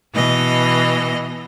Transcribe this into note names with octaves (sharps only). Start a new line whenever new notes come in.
B2 E3 D#5